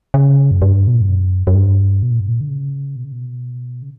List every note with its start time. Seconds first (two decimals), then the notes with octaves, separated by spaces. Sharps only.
0.14 C#3
0.51 F#2
0.62 G2
0.87 B2
0.94 A#2
1.01 G2
1.09 F#2
1.47 F#2
1.55 G2
2.03 B2
2.11 A#2
2.20 G2
2.29 A#2
2.41 D3
2.49 C#3
2.96 B2
3.04 C#3
3.12 B2
3.82 C#3